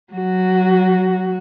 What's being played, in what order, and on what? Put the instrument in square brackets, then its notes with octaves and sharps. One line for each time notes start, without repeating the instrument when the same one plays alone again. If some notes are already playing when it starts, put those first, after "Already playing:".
[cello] F#3 F#4